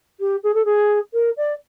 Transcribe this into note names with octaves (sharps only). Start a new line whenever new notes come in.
G4
G#4
A4
G#4
A#4
D5